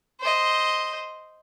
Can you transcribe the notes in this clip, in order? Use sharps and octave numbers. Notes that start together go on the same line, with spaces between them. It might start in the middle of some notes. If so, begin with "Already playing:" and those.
C5 D#5